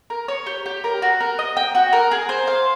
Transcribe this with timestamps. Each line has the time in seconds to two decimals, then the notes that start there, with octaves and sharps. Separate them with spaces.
0.10 A#4
0.28 C#5
0.47 G4
0.66 G4
0.84 A#4
1.02 F#4
1.21 A#4
1.39 D#5
1.57 G5
1.75 F#4
1.93 A#4
2.11 G#4
2.29 C5
2.47 F5